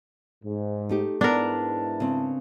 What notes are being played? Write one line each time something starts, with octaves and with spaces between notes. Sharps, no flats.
G#2
A3 D#4 G4
G#2 B3 D4 E4 A#4 A5
C#3 C4